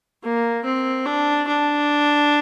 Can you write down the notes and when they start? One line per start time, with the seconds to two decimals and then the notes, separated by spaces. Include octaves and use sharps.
0.23 A#3
0.64 C4
1.06 D4
1.48 D4